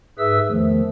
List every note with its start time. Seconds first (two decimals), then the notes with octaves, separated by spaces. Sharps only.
0.19 G#2 G#4 B4 E5 E6
0.49 E2 D#3 F3 A3